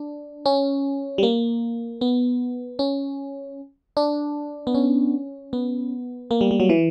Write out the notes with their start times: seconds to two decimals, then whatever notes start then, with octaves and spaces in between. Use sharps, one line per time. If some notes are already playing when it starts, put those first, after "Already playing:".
Already playing: D4
0.46 C#4
1.18 G3
1.23 A#3
2.01 B3
2.79 C#4
3.97 D4
4.67 B3
4.75 C#4
5.53 B3
6.31 A#3
6.41 G3
6.51 G3
6.60 F#3
6.69 E3